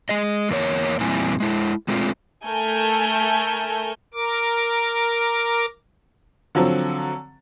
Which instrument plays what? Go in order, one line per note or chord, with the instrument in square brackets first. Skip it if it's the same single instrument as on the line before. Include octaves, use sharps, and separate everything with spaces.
[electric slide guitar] G#3 G#4 D#5
E2 A#3 C#5
E2 A#2 G3 C4 E4 G#5
G#3 E4
G#3 A3 C4 F4
[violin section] A3 A4 A#4 G#5 G6
[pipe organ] A#4 D6
[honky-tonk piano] D3 F3 F#3 C4